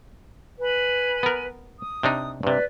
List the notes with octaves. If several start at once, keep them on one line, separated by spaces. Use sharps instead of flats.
B4 G#5 B5
B3 A#4
D#6
C3 D4 D#4
G2 C3 B4 D5